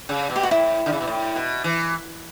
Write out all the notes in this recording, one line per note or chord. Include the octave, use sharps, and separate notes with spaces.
C#3
B2
G4
F#4
A2 E4
D3
C#3
B2
A2
B2
E3